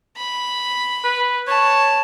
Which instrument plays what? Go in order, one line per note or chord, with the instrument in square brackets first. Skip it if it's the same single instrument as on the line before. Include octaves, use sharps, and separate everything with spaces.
[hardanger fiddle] B5
[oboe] B4
[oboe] C#5 [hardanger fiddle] A5